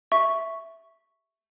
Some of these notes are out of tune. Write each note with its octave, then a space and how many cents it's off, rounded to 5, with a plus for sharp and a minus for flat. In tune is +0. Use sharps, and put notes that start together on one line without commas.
E5 +0 C#6 +0